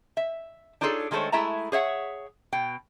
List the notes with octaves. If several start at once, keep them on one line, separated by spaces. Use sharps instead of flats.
E5
D4 D#4 F4 G#4 A4 C#5
D#3 G#3 A3 A4 C5 C#5
G#3 A3 E4 E5 A5 A#5
G#4 C#5 E5 F#5
B2 G5